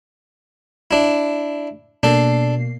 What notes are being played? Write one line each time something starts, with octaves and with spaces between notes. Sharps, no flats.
D4 E4
B2 A#3 D4 A4 C7